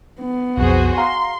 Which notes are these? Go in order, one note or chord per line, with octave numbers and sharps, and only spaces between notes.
B3
B1 F2 F#4 G#4 C5
F5 A#5 C6